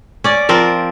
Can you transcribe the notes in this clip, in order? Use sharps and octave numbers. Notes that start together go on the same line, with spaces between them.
C#4 D5
F3 C4 A#4